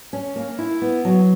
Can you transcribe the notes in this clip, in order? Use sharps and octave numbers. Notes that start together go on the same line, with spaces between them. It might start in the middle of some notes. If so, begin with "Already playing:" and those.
C#4
A#3
E4
B3
F#3